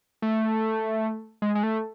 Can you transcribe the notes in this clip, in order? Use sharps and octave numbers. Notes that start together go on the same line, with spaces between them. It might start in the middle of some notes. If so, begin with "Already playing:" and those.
A3
G#3
G#3
A3